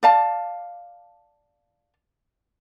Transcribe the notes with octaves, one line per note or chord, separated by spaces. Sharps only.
D5 F5 A5